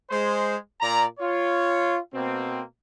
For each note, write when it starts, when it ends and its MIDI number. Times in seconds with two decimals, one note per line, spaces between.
0.10 0.56 56
0.10 0.56 72
0.81 1.05 46
0.81 1.05 74
0.81 1.05 82
1.19 1.98 65
1.19 1.98 73
2.14 2.61 47
2.14 2.61 58
2.14 2.61 60